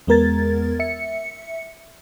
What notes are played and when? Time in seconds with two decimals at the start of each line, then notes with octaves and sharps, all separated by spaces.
0.07 E2 G#3 B3 A#4 G#6 A6
0.79 E5 C#7